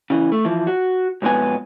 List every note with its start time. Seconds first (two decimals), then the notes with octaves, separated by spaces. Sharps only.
0.10 C#3 E3
0.32 A3
0.45 E3 F3
0.67 F#4
1.22 B1 F2 G#3 B3 G#5